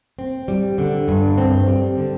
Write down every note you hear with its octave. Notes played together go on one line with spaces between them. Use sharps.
C4
G3
D3
G2
C4
G3
D3